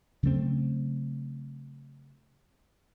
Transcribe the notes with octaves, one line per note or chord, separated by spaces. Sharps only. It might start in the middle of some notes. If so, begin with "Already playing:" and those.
C#3 F#3 A3 C4